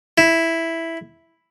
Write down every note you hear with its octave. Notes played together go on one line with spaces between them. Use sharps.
E4